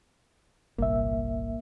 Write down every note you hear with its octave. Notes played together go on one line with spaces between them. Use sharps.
G1 C2 A#2 A#3 E5